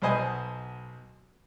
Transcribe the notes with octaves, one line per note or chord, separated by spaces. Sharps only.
B1 B2 B4 C5 D#5 G#5